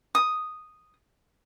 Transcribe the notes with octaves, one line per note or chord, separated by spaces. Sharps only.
D#6